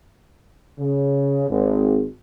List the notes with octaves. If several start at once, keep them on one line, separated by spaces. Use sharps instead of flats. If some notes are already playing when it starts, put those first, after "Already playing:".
C#3
G#1